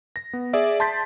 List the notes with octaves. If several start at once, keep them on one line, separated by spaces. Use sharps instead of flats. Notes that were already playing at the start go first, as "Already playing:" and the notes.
A#6
B3
G#4 D5 E5
A5 C6 G6 A6 B6